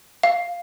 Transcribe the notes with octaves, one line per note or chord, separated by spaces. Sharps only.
F5